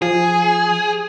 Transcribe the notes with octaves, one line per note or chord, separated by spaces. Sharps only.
F3 G#4